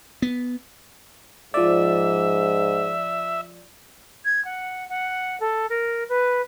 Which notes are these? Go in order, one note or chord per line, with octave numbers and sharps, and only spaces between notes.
B3
G#2 F3 D5 E5
G#6
F#5
F#5
A4
A#4
B4